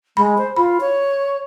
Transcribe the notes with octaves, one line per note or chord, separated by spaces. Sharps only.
G#3 B5
C5
F4 B5
C#5